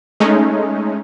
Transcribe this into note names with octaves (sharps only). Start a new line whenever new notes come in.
G#3 A3 C#4 D#4